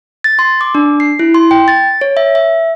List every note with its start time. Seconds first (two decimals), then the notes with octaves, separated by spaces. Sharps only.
0.24 A6
0.39 C6
0.61 D6
0.75 D4
1.00 C7
1.19 E4
1.35 C6
1.51 G5
1.68 A6
2.01 C#5
2.17 E5
2.35 E5